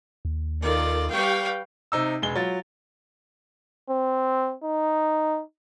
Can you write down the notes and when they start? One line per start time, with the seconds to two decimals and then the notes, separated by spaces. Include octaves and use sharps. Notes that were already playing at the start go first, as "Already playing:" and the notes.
0.25 D#2
0.62 D#3 F4 A4 D5
1.10 G3 B4 F5 G5 C#6
1.92 C3 D#4 E6
2.22 E1 G#3 G7
2.35 F#3 F4 A6
3.90 C4
4.64 D#4